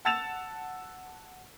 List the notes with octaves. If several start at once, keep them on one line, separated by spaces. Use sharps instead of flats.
F#5 A5 E6 A6 E7 F7